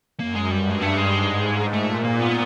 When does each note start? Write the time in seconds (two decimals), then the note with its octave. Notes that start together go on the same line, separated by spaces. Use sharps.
0.20 F#2 A#3
0.35 G#3
0.51 G2 G3
0.70 G#3
0.81 A3
0.97 G#3
1.12 G#2
1.73 A#2 A3
2.05 A#3
2.20 B3